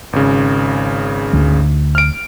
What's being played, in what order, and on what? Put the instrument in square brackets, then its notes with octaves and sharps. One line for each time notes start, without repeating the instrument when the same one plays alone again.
[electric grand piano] G#1 C#3
[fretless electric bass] D2
[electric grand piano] F6 D7